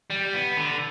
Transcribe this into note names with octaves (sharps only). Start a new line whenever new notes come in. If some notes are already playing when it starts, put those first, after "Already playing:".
G3
B3
D3